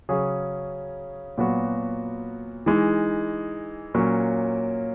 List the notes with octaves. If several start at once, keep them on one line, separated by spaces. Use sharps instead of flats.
C#3 F#3 C#4 G#4
A#2 F#3 B3 F#4
E3 G#3 D#4
A#2 F#3 A#3 C#4